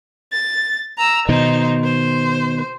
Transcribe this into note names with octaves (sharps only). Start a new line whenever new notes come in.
A6
A#5 E6
B2 D#3 D#4 C5
C5